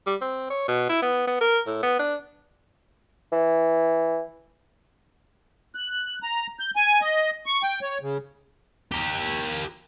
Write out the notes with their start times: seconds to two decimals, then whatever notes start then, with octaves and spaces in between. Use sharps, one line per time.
0.07 G3
0.21 C4
0.50 C#5
0.68 B2
0.90 E4
1.02 B3
1.27 B3
1.41 A#4
1.67 A2
1.83 B3
1.99 D4
3.32 E3
5.75 F#6
6.23 A#5
6.59 G6
6.76 G#5
7.01 D#5
7.46 C#6
7.63 G5
7.82 C#5
8.02 C#3
8.92 G4 A#4